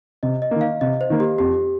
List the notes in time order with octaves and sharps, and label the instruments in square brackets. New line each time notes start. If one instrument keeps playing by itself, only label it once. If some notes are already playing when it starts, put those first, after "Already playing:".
[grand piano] C3 [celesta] D#5
[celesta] D#5
[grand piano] D#3 A#3
[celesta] F5
[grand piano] C3 [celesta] D#5
[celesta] C5
[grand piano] D#3 A#3
[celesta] G4
[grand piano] F2 [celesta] G4